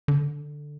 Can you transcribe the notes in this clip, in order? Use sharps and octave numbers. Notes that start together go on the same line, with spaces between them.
D3